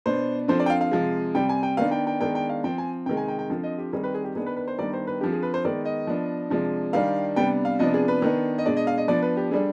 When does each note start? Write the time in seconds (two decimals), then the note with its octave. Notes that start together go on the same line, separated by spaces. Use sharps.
0.06 B2 B3 D4 C5
0.48 D3 F3 C4 C5
0.60 D5
0.66 G5
0.70 F5
0.81 F5
0.91 C3 F3 G#3
1.35 C3 G3 C4 G5
1.49 G#5
1.63 G5
1.77 D#3 B3 D4 F5
1.91 G5
2.07 G5
2.20 D#3 G#3 B3 D4 G5
2.35 G5
2.49 F5
2.64 F3 C4 G5
2.78 G#5
3.06 C3 G5
3.09 D#3 G#3
3.17 G#5
3.28 G5
3.39 G5
3.50 D3 F3 C4
3.64 D#5
3.78 G4
3.93 D#3 G3 C4 G#4
4.04 B4
4.14 G#4
4.25 G4
4.35 D#3 B3 D4 G#4
4.46 B4
4.56 B4
4.68 C5
4.78 D#3 G3 B3 D4 D5
4.93 C5
5.07 B4
5.21 D3 F3 C4 G4
5.32 G#4
5.43 B4
5.54 C5
5.65 D#3 G#3 B3 D5
5.85 D#5
6.07 F3 B3 D4
6.50 C3 F3 G#3 D4
6.93 D#3 G3 D4 F5
7.36 C3 G3 B3 D4 G5
7.65 F5
7.79 C3 F3 B3 D4 D#5
7.94 G#4
8.08 B4
8.22 D#3 B3 D4
8.58 D#5
8.66 B2 G#3 D4 D5
8.77 D#5
8.87 F5
8.98 D#5
9.08 F3 B3 D4 D5
9.22 B4
9.37 G4
9.51 D3 G3 D4 G#4